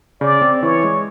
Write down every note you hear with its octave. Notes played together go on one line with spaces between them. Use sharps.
C#3 D5
C4
E3 C#5
G#3